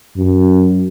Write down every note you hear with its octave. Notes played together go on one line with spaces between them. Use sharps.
F#2